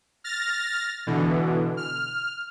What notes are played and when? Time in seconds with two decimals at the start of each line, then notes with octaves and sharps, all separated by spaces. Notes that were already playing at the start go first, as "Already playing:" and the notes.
0.24 F6 A6 A#6
1.07 B2 D3 E3
1.77 F6